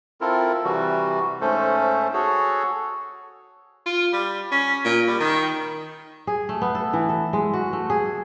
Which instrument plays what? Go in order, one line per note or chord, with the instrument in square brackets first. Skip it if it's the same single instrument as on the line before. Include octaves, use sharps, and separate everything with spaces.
[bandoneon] C4 E4 F4 A4 A#4
C3 E3 G3 F#4
G#2 A3 C#4 A4 C5
F#4 G#4 A4 C#5
[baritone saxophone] F4
G3
C#4
A#2
G3
D#3
[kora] G#4
A3
B3
A4
E3
A4
G#3
F#4
A3
G#4